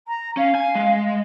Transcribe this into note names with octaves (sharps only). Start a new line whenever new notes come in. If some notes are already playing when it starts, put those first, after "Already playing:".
A#5
C#4 F5
G#5
G#3